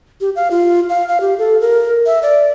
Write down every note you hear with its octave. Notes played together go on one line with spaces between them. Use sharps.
G4
F5
F4
F5
F5
G4
A4
A#4
E5
D5